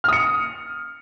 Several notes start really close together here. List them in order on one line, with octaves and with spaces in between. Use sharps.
F6 D#6 C#7